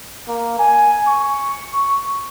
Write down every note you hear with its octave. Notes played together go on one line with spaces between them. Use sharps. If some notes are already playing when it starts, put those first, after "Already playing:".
A#3
G#5
C#6